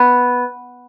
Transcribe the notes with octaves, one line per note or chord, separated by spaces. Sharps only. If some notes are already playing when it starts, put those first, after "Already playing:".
Already playing: B3